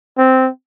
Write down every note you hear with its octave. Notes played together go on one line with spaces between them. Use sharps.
C4